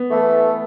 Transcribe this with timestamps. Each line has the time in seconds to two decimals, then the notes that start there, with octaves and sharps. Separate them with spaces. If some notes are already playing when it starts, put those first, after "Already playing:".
Already playing: B3
0.10 E3 A3